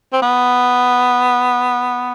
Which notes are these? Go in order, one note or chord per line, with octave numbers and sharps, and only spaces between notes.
C4
B3